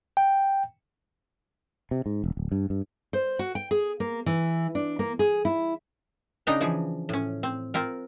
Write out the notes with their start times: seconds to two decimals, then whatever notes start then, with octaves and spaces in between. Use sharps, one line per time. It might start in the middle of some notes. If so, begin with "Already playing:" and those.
0.17 G5
1.91 C3
2.06 G#2
2.24 E1
2.37 D1
2.52 G2
2.70 G2
3.13 C5
3.39 F#4
3.55 G5
3.71 G#4
4.00 A#3
4.26 E3
4.75 D4
4.99 A#3
5.19 G#4
5.45 E4
6.47 C#3 D4 D#4 G5 A#5
6.61 E3 F3 G#4
7.09 A2 C#4
7.43 C4
7.74 C4 F4 A#4